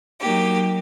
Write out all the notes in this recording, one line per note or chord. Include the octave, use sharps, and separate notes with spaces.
F#3 A#3 D#4 G4